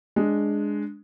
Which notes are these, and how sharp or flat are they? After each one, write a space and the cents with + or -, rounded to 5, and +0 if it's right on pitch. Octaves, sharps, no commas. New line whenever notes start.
G#3 +0 D4 +0